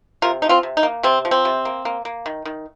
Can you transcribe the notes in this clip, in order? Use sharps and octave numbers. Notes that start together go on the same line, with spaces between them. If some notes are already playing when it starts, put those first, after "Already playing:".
C3 F4 A#4
F3 D#4
C4 F4
C3
D#4
A#3
C3 C4
F3
C4
C3
A#3
A#3
A#3
D#3
D#3